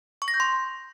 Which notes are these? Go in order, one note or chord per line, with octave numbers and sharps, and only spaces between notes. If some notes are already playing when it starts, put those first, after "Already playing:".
C#6
A#6
G6
C6